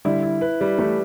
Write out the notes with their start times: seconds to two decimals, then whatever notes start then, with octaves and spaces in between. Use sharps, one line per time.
0.05 D3 G3 E4
0.23 E4
0.41 B4
0.61 G3
0.78 E3 G3 A3